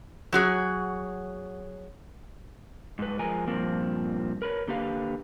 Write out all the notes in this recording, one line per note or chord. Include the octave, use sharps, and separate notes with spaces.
F#3 F#4 G#4
G#2 B4
F3 G#3 A#4 G#5
G2 A#2 F3 A#3 C4
A#4 B4 C#5
D3 A#3 G4 B4 F5